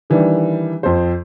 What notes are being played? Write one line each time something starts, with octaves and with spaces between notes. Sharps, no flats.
D#3 E3 G3 D4
F2 C5